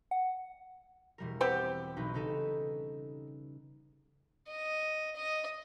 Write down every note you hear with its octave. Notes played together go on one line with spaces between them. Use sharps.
F#5
E1 G3 A#4
B3 C4 G4
B1 D#4 B4
C#3 D#4 A4
D#5
D#5